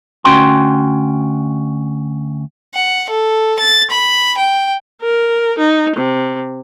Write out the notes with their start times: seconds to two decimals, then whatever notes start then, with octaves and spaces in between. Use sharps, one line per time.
0.24 D2 C4 C#4 F#4 G5 C6
2.75 F#5
3.10 A4
3.59 A6
3.91 B5
4.38 G5
5.02 A#4
5.59 D#4
5.96 C3